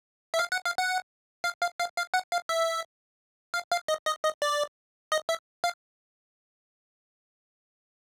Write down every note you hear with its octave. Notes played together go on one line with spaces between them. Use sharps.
E5
F5
F#5
F5
F#5
F5
F5
F5
F5
F#5
F5
E5
F5
F5
D#5
D#5
D#5
D5
D#5
E5
F5